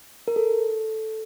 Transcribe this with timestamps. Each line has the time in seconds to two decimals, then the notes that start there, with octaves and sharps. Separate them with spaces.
0.28 A#4
0.36 A4